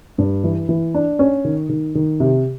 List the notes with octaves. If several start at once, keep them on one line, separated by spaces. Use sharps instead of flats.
G2
E3
E3
D4
C#4
D#3
D#3
D#3
C3